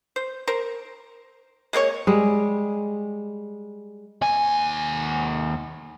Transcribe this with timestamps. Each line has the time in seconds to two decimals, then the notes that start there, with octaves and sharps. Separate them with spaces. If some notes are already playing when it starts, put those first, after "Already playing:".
0.16 C5
0.47 A#4 C5
1.73 G#3 A#3 G#4 C#5
2.07 G3 G#3
4.22 D#2 G#5